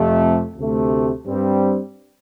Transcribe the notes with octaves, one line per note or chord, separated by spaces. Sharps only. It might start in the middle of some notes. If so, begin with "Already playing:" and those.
Already playing: F2 C3 A3
D2 C3 A3
G2 G3 C4